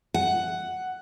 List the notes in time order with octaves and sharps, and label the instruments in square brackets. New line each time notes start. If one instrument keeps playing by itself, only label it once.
[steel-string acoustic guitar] F#5